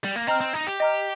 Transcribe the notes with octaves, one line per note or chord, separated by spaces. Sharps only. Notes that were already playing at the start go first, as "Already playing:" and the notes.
G3
A#3
C4 D#5 A#5 F6
C4
D#4
G4
D#5 A#5 F6